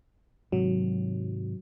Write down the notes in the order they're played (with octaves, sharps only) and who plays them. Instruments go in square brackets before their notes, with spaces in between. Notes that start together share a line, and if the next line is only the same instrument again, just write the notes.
[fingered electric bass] G#2 C3 D#3 [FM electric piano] F#3